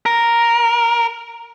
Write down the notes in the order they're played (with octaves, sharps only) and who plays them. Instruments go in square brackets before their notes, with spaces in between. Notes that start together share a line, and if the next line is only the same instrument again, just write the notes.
[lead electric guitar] A#4